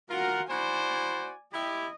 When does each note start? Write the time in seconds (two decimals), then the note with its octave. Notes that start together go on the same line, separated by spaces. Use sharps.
0.10 F4 F#4 A#4 F#5
0.50 E4 F#4 C5 D5 G#5
1.53 E4 G4 D#5